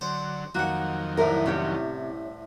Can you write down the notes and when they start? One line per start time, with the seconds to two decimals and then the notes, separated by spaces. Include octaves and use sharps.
0.01 D3 F#3 C5
0.55 F2 D#3 F#3 A#3 F#4 F#5
1.18 C2 A2 A#4
1.46 C3 C#4 G4 C#5